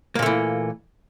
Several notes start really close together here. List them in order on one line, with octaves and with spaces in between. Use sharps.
A#3 A#2 A3 E3